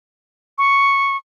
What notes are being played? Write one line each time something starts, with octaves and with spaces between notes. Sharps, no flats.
C#6